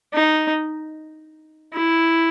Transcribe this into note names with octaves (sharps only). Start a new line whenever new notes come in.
D#4
E4